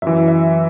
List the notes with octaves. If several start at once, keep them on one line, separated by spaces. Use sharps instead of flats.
F#2 E3 E5
E5